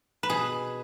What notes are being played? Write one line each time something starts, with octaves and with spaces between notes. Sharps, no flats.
B4
B2 G#4